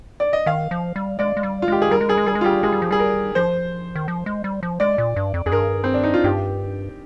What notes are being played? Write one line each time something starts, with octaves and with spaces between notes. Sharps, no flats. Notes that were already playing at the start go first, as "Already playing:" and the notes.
D5
D#5
D#3 F5
F3
G3
G#3 D5
G#3
G3
F4
G#3 G4
G#4
G3 A#4
G#3
G3 G#4
G#3
G3 G#4
G#3
F4
G3 G4
G#3 G#4
G3
F3
G3 G#4
A#4
F3 C5
D#3
F3
G#3
G3
F3
G#3 D5
A#2
G2
F2
F2 G#4
G2 A#4
C4
D4
D#4
F4
G2 G4